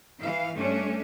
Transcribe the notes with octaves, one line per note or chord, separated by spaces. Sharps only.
E3 F5
G2 A3 C#4 D4